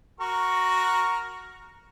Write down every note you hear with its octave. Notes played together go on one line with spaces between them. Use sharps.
F#4 A#4 C#6